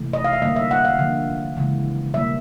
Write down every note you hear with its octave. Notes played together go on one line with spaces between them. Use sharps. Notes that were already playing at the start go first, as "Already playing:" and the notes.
Already playing: C3 E3 A3
D#5
F5
E5
D3 G3 A#3 D#5
E5
F#5
F5
D3 F3 A#3
C#3 E3 G#3
B2 G3 A#3 E5